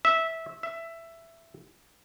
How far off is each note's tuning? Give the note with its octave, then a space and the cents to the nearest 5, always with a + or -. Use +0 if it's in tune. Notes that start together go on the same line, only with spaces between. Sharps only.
E5 -15
E5 +10